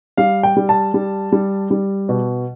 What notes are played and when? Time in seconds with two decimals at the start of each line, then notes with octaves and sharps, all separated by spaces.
0.17 G3 F5
0.43 G5
0.57 G3
0.69 A5
0.94 G3
1.32 G3
1.71 G3
2.09 B2